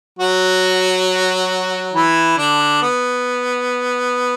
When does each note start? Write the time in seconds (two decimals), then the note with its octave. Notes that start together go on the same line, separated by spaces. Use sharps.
0.19 F#3 F#4
1.94 E3 E4
2.38 D3 D4
2.82 B3